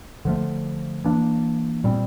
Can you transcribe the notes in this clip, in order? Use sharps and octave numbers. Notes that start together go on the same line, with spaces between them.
D3 F3 A3
E3 A#3 D4
A#2 G3 C4